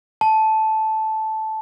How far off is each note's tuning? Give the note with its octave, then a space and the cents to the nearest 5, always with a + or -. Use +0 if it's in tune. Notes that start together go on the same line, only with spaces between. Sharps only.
A5 -10